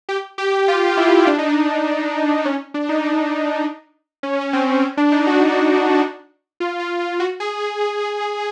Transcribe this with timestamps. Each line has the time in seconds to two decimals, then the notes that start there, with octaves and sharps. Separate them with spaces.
0.09 G4
0.38 G4
0.68 F4
0.97 E4
1.27 D4
1.38 D#4
1.49 D4
2.45 C#4
2.74 D4
2.89 D#4
3.03 D4
4.23 C#4
4.41 C#4
4.53 C4
4.82 C#4
4.97 D4
5.12 D#4
5.27 F#4
6.60 F4
6.80 F4
6.99 F4
7.20 F#4
7.40 G#4